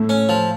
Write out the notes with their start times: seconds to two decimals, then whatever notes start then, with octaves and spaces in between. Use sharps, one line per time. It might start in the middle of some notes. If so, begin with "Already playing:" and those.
Already playing: A2 A3
0.09 C#4
0.29 F3